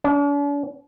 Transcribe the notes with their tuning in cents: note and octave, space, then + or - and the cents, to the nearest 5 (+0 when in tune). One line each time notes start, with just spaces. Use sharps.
D4 -45